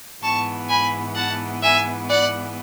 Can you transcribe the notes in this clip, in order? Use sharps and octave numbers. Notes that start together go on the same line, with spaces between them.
G#2 E3 B3 A5 C#6
G#5 B5
F#5 A5
E5 G#5
D5 F#5